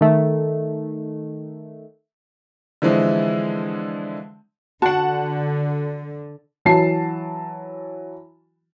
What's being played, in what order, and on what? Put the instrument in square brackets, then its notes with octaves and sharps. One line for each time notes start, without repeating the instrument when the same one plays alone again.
[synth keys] D#3 A3
[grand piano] D3 E3 F3 G#3 C4 E4
[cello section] D3 [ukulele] F#4 [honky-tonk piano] F#5 A5
[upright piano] E3 F#3 A5 C7